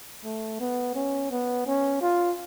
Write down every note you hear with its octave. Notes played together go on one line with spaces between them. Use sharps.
A3
B3
C#4
B3
C#4
F4